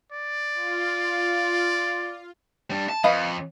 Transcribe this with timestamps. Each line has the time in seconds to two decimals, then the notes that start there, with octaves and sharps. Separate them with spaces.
0.12 D5
0.54 F4
2.70 G3 D4
2.89 A5
3.04 F2 B4 D#5 F5